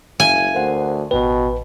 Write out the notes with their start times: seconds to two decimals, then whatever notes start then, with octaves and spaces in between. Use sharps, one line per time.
0.20 F#1 E5 F5 G#5
0.55 D2 A#4 C5 F#5
1.11 A1 B2 B4 G5